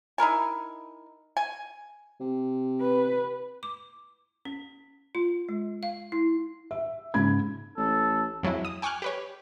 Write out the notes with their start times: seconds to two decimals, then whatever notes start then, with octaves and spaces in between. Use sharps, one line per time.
0.18 D#4 E4 A#4 G#5
1.37 G#5
2.20 C3
2.82 B4
3.63 D6
4.45 C#4
5.15 F4
5.49 G#3
5.83 F5
6.12 E4
6.71 E5
7.14 G#2 C#3 B5 G#6
7.77 A1 A4
8.43 F2 F#3 G#3 E4
8.65 D#6
8.82 G5 G#5 C#6 D6 F6 F#6
9.02 G4 B4 C#5